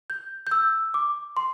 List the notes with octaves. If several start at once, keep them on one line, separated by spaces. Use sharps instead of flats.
G6
G6
E6
D6
C6